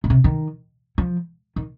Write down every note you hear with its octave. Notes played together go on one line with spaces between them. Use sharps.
A#2
C3
D#3
F3
D#3